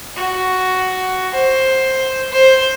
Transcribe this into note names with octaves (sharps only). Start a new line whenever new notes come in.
F#4
C5
C5